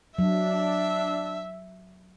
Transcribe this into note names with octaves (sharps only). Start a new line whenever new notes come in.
F#3 D4 E5